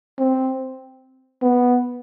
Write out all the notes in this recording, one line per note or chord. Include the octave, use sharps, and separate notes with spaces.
C4
B3